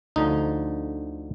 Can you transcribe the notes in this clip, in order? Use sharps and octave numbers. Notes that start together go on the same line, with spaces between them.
D2 D3 F3 D#4